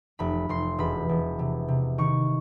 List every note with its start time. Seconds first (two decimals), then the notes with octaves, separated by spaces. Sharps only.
0.19 F1 B5
0.49 F1 C6
0.78 E1 B5
1.09 E1
1.39 C3
1.68 C3
1.98 D#3 C#6